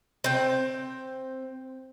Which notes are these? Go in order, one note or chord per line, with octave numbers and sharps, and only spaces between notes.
C4 G5